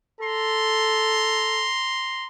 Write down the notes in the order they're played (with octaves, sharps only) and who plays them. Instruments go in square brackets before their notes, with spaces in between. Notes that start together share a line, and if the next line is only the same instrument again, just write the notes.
[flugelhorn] A4 [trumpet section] A#5 C6